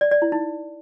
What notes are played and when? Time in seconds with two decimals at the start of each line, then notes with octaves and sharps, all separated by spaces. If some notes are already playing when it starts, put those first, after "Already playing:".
0.01 D5
0.11 D5
0.22 E4
0.32 D#4